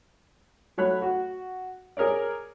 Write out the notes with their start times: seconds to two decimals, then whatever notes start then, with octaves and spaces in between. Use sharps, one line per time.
0.78 F#3 A3 C#5 B5 F#6
1.02 F#4
1.97 G#4 A#4 C#5 D5